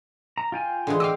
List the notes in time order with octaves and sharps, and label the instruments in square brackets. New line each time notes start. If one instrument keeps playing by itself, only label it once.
[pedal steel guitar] A#5
F4 G5 G#5
[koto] D3 E3 G#3
[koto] D#5 F5 [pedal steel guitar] G5 D6 E6